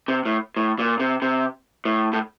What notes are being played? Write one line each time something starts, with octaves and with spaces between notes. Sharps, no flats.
C3
A2
A2
A#2
C3
C3
A2
A2